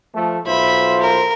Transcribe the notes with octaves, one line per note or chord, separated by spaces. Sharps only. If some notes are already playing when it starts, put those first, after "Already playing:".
F3 A3
B1 F4 C5 E5 B5
A#4